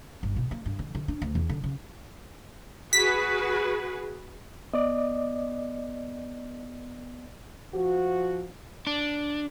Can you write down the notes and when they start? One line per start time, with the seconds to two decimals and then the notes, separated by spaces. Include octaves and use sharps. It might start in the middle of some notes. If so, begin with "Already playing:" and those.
0.23 G1
0.36 B2
0.51 A#3
0.66 G2
0.79 D#3
0.95 D3
1.08 D4
1.22 D2
1.35 E2
1.49 D3
1.64 C#3
2.93 F#4 G#4 B4 B6
4.73 B3 D5 D#5
7.74 F3 F#4
8.87 D4